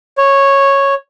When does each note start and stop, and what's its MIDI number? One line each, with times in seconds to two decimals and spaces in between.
0.18 0.94 73